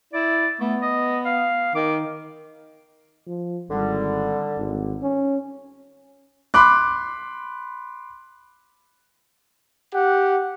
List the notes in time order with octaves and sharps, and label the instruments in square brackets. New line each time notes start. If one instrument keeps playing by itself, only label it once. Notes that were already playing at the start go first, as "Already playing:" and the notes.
[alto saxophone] E4 [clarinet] D5
[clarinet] A3 [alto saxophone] B3
[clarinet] D#5
F5
[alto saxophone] D#3 [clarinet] D6
[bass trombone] F3
[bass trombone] G#1 [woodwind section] D3 G3
[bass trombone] G#1
C#4
[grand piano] B5 C6 D6 F#6
[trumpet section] G4 F#5